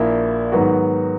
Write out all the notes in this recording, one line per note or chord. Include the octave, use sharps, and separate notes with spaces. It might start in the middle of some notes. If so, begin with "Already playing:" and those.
Already playing: A#1 A#2 A#3 E4
G#2 D#3 F#3 B3 F#4